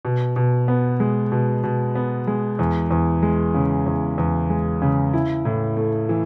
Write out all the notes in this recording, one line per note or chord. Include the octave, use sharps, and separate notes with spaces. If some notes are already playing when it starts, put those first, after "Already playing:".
B2
B2
B3
G#3
B2
B2
B3
G#3
E2
E2
G#3
C#3
E2
E2
G#3
C#3
E4
A2
A3
E3